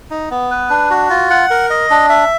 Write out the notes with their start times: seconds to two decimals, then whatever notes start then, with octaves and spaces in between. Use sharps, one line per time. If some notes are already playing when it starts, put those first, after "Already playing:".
0.11 D#4
0.31 B3
0.51 B4
0.70 D4
0.90 F#4
1.10 F4
1.30 F#5
1.50 A#4
1.70 D#5
1.90 D4
2.09 E5